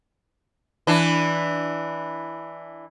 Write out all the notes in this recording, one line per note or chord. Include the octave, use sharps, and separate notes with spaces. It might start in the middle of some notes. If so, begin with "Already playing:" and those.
E3 D4